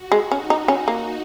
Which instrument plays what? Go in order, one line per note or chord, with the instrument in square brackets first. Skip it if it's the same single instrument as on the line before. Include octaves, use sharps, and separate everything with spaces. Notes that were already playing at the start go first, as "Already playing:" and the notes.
Already playing: [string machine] F#4
[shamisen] G#3
[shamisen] C#4 [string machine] D#4
[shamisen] D#4
[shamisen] C#4 [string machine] F#4
[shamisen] A#3